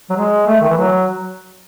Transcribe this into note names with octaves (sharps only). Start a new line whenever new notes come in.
F#3
G#3
A3
D#3
E3
F#3